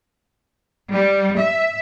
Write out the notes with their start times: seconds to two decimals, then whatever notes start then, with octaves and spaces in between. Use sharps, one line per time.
0.91 G3
1.38 E5